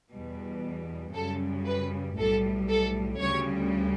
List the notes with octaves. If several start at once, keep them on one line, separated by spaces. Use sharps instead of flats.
E2 B2 G3
F#2 C#3 G3 A4
B4
B1 A2 G3 A4
A4
D2 C#3 G3 C#5